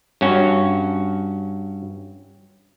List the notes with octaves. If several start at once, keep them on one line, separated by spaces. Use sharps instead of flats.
G2 C#4 F#4